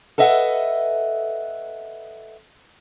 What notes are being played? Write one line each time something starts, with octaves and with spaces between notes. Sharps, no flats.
A4 B4 D#5 E5 F#5